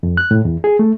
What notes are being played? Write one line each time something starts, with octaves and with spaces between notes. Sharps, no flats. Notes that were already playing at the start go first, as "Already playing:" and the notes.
F2
F#6
A2
E2
G#4
A3